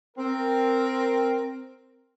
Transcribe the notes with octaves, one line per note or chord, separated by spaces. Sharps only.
C4 A#4